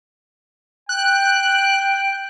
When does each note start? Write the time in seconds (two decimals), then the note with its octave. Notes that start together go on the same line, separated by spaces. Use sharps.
0.89 G5 F#6